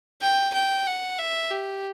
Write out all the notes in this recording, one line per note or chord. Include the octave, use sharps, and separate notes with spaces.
G5
G5
F#5
E5
G4